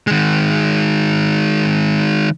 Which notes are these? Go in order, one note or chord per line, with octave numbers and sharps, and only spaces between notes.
D#3 G#3